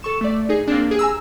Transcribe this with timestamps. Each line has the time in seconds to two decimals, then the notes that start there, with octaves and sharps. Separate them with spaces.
0.03 A4 C#6 E7
0.21 A3 D5
0.49 D#4 G#4
0.67 A#3 C4 D4
0.87 G4 G#4
0.99 G#5 A#5 E6